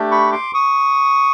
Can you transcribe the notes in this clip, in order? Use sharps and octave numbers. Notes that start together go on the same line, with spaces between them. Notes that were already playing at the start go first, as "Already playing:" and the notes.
Already playing: A3 D4 G4
B5 C#6
C6 D6
C#6 D#6